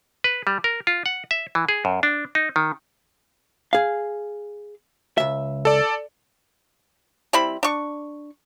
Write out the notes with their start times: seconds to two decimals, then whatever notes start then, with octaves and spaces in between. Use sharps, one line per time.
0.24 B4
0.47 G3
0.64 A#4
0.87 F4
1.06 F#5
1.31 E5
1.55 E3
1.69 G#4
1.85 F#2
2.03 D4
2.35 D#4
2.56 D#3
3.73 G#4 F5
5.18 C#2 E5
5.65 A4 D5
7.33 G3 C4 E4 B5
7.63 D4 C#6